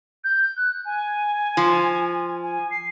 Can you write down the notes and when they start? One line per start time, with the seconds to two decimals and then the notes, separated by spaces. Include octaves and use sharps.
0.24 G6
0.57 F#6
0.85 G#5
1.57 F3
2.43 G#5
2.71 C7